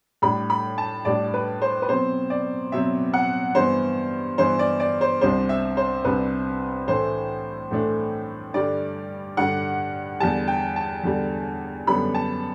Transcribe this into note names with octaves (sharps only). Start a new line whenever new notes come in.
A2 G3 D4 B5
B5
A5
A2 G3 D4 D5
B4
C5
B4
B2 F#3 C4 C5
D5
B2 F#3 C4 E5
F#5
G2 E3 B3 C5
G2 E3 B3 C5
D5
D5
C5
C2 C3 G3 D4 C5
E5
C5
C2 C3 G3 D4 B4
A2 E3 A3 D4 C5
A2 E3 A3 D4
G2 D3 G3 D4 D5
G2 D3 G3 D4 F#5
E2 D3 G3 A5
G5
A5
E2 D3 G3
F#2 D3 G3 B3 D4 B5
A5